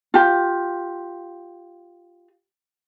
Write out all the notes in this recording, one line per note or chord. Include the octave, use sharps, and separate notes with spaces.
F4 G4